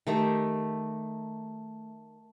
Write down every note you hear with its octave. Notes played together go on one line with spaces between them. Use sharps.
D#3 A3 G4